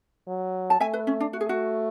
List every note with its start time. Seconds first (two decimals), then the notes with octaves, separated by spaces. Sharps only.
0.28 F#3
0.70 A5
0.80 A3 E5 G#5
0.93 B4
1.07 C#4
1.20 D4
1.33 A3 F#4
1.41 G#4
1.49 F#4